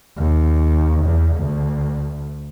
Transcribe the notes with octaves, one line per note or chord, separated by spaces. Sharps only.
D#2
E2
D2